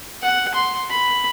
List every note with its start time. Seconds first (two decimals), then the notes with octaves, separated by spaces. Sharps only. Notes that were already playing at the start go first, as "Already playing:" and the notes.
0.22 F#5
0.54 C6
0.90 B5